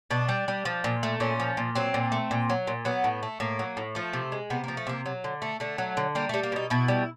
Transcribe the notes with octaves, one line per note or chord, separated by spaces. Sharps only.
B2 D4
G3
G3
F3
A#2
A3
A#2 C#4
F3
A#2
F#3 C4
A#2
A3
A#2
F#3
A#2
F#3 B3
A2
A3
A2 A#3
F#3
A2
F3 A3
C3
G#3
C3 B3
F3 A#3
A3
C3 A#3
F#3
D3
A3
D3 A3
F#3
D3
G3 A#3
G3 A3
A#3
B2 D#4
B2 E4
G3